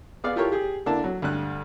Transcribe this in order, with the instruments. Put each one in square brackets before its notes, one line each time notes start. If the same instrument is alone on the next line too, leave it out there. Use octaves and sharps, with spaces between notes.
[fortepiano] B3 G#4 D5 F5
E4 F4 G4 A4 A#4 C#5
G4 G#4
D3 A#3 D4 E4 A4 A5
F#3
D2 G2 F#6